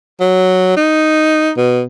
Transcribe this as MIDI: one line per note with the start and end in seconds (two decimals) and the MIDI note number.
0.21 0.74 54
0.77 1.51 63
1.57 1.83 47